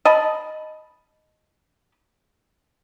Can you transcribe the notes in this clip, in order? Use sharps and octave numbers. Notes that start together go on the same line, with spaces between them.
D#5 A5 B5